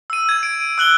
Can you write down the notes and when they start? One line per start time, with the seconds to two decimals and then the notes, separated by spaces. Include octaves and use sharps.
0.10 E6 D#7
0.29 G#6 D#7
0.43 D7
0.78 E6 F#6 F#7 G7